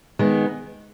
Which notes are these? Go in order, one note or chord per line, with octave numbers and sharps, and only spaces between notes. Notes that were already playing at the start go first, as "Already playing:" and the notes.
D#3 G#3 B3